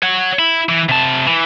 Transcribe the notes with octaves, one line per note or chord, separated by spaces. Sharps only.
C#5 F#5
E4
E3
C3 A5
E3